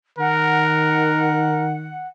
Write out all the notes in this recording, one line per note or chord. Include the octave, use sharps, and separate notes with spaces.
D#3 A#4 F#5